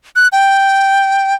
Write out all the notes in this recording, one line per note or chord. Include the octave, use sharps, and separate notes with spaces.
F#6
G5